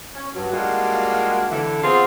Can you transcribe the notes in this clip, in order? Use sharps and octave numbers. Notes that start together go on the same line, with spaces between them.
C#4
G2 F#3
G3 G#3 A#3 D4 F4 F#4
D3 E3
B3 C4 F4 G#4